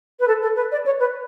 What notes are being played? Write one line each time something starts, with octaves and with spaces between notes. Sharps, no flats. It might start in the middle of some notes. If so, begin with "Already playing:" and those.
B4
A4
A4
B4
D5
C#5
B4